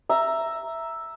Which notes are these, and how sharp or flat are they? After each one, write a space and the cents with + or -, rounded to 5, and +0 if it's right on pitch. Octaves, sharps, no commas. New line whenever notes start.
E5 +0 A#5 +0